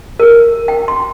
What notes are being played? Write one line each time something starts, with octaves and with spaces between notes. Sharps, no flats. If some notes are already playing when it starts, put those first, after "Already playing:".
A#4
G5
C6